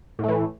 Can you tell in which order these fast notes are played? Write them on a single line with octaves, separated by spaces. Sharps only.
A2 A3 E3